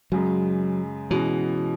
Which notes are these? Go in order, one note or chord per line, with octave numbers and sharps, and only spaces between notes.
F#2 C#3 F#3 G#3
B2 E3 G#3 C#4 F#4